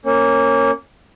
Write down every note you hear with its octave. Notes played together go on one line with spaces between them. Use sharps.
A#3 C#4